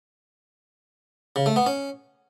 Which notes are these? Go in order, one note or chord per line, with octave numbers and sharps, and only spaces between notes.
C#3
A3
B3
C#4